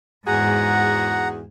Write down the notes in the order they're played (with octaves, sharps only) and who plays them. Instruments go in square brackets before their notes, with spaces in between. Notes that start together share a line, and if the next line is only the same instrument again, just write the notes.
[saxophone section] E2 F#4 G#4 [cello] G#2 [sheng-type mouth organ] F#5 A#5